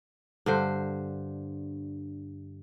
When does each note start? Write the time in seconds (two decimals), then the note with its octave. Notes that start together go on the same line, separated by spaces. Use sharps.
0.46 G2 D3 C5